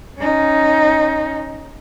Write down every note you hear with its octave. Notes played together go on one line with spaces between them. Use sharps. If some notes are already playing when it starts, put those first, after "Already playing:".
C#4 D#4